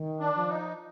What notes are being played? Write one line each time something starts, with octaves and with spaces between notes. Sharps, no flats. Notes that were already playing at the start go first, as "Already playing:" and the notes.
Already playing: D#3
D4
F3
D#4